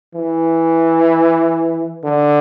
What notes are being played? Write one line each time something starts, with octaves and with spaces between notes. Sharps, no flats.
E3
D3